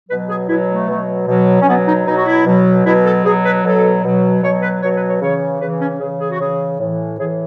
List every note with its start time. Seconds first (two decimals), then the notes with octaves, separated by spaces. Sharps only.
0.10 B2 F#3 B4
0.29 G#4
0.49 B2 F#3 E4
0.69 A3
0.88 B2 F#3
1.28 B2 F#3
1.62 C#4
1.67 B2 F#3 B3
1.87 D#4
2.06 B2 F#3 D#4
2.16 F#4
2.26 E4
2.46 B2 F#3
2.85 B2 F#3 E4
3.05 A4
3.25 B2 F#3 G#4
3.45 B4
3.64 B2 F#3 A4
4.04 B2 F#3
4.43 B2 C#5
4.48 F#3
4.63 B4
4.82 B2 F#3 C#5
4.96 B4
5.08 C#5
5.22 C#3 E3 C#5
5.61 C#3 E3 B4
5.81 C#4
6.00 C#3 E3 G#4
6.20 G#4
6.31 F#4
6.40 C#3 E3 G#4
6.79 A2 E3
7.19 A2 E3 G#4